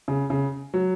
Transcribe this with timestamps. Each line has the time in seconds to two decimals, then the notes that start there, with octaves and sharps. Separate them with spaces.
0.08 C#3
0.30 C#3
0.74 F#3